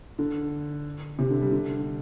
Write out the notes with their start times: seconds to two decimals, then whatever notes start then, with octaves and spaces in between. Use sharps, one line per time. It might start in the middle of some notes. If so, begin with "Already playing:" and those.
0.19 D3
1.19 C3
1.30 D3
1.41 G3
1.52 D3